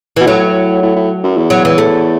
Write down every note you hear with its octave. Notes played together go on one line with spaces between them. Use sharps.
B2 E3
A2 F#3
A2
A2
F#2
E2
F#3
E3
A3